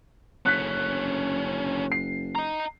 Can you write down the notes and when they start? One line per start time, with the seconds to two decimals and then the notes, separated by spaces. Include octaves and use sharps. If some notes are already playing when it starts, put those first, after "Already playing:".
0.46 F#1 D3 C#4 F#6 B6
1.92 C7
2.35 D#5 A#5